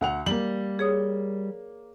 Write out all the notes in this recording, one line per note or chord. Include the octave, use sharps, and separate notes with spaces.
D2 F#5 F7
G3 A#3 F#7
G#4 C#5 D#6